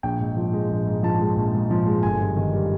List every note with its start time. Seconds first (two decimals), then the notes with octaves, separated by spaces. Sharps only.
0.03 A#1 G5
0.20 G#2
0.37 F3
0.53 G#3
0.70 A#1
0.86 G#2
1.03 F3 A5
1.21 G#3
1.37 A#1
1.53 G#2
1.71 F3
1.86 G#3
2.03 G1 G#5
2.21 G2
2.36 D#3
2.53 G3